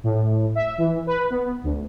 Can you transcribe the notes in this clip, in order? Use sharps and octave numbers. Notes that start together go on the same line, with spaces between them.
A2
E5
E3
B4
B3
D2